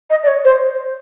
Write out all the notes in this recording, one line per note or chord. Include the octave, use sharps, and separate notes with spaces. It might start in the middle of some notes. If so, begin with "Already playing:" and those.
D#5
D5
C#5
C5